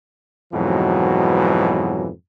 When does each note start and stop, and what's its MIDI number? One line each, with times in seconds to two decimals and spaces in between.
0.53 2.10 41
0.53 2.10 44
0.53 2.10 47
0.53 2.10 52
0.53 2.10 54